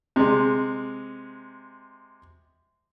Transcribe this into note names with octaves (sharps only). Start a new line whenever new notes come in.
C3 G#3